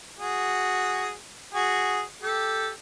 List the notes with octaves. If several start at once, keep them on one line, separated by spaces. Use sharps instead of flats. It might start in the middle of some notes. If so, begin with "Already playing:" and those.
F#4 G#4
F#4 G#4
G4 A4